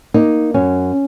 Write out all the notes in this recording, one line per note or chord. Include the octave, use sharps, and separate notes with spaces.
A#3 D#4
F#2 C#4